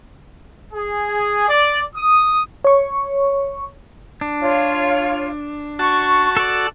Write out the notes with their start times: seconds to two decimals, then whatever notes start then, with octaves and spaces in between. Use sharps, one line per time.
0.74 G#4
1.49 D5
1.95 D#6
2.64 C#5 C#6
4.21 D4
4.41 F4 C#5
5.79 F#4 A5 C#6
6.37 A4 D5